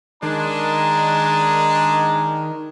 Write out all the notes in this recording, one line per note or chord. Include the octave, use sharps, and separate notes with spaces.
D#3 G#3 D4 A#5